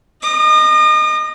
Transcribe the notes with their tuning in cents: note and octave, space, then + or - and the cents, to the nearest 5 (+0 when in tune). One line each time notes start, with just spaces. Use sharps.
D#5 +0 D#6 -40